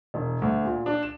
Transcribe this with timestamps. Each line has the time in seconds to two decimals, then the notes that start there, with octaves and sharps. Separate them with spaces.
0.14 E1
0.42 D2
0.65 A#2
0.86 D4
1.03 E7